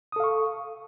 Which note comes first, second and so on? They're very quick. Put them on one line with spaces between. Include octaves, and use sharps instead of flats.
D#6 A4 F5 C#6